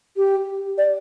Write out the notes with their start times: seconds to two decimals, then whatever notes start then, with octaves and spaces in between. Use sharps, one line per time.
0.17 G4
0.78 D5